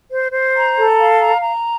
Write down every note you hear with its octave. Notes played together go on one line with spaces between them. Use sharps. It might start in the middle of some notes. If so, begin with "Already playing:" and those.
C5
C5
A#5
A4
F5
A#5
A#5